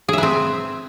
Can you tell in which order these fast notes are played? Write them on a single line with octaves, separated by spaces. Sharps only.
G#4 E5 B4 C4